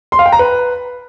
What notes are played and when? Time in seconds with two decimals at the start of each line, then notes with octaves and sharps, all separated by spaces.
0.12 C6
0.19 F5
0.26 G5
0.32 A#5
0.39 B4